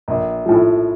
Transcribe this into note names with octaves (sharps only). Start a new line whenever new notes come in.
A#1
A2 F3